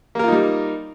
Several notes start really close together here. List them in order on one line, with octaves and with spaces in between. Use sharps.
A#3 A#4 F4 D#4 G3